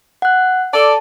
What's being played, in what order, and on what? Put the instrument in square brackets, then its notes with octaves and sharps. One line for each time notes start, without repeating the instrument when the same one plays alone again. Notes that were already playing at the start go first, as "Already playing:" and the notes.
[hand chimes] F#5 F#6
[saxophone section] A4 D5 [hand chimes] A5